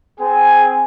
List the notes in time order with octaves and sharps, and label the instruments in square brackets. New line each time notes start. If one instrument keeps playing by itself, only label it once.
[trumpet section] C4 G#4 G#5